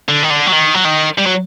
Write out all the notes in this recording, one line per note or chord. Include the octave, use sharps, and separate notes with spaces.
D3
D#3
D3
F#3
D#3
F#3
D#3
G3
F#3